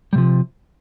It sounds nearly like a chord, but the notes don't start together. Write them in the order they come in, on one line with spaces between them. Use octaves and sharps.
G3 C3 F3